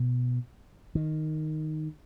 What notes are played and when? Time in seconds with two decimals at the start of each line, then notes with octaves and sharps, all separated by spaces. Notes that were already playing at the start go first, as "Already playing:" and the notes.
Already playing: B2
0.95 D#3